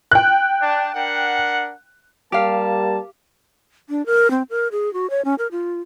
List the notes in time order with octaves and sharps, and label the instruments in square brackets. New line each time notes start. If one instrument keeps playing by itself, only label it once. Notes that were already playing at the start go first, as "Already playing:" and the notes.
[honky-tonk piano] G5 F#6
[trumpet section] D4 A5
D4 A#4 F#5
[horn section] G3 A#3 A5 [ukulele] G4 F5
[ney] D4
A#4
C4
A#4
G#4
F#4
C#5
C#4
A#4
F4